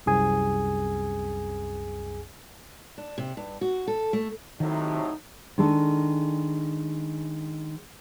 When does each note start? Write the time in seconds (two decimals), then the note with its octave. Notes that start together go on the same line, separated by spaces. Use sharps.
0.06 C2 F#2 G#4 G#5
2.98 D4
3.18 C3
3.37 G2
3.61 F#4
3.87 A4
4.13 A3
4.60 A2 C3 D#3 F#3 D#4
5.58 D#3 G#3 D4 G#4 A4